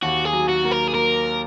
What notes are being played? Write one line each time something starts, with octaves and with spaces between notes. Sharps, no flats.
D#2 F#4
G#4
F#3
F#4
A#3
A#4
G#4
A#3 A#4